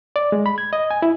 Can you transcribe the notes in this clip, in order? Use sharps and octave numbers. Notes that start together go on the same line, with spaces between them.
D5
G#3
B5
G#6
D#5
G#5
E4